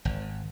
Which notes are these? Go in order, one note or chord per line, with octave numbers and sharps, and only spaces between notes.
G#1